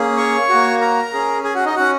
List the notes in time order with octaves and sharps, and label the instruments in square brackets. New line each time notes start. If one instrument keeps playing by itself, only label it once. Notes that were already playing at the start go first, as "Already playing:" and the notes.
Already playing: [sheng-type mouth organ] A#3 C#4 G#4
C#5 C#6
A#3 F#4
A#4 A#5
C#4 G#4
G#4 G#5
F#4 F#5
D#4 D#5
C#4 F#4 F#5